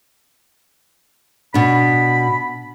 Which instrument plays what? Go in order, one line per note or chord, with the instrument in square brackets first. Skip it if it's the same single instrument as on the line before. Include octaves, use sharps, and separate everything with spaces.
[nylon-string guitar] B2 D4 [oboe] B5